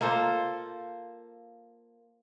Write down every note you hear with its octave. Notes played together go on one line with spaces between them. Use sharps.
A#3 F4 A4 C5